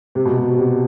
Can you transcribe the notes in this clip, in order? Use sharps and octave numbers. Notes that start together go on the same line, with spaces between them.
C3
B2
C3
C3